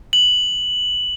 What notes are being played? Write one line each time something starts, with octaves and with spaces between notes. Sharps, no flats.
F#7